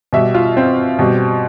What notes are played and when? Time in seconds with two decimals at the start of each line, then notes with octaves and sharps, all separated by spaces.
0.13 B2 G3 E5
0.35 F4
0.57 C4
0.99 B2 G3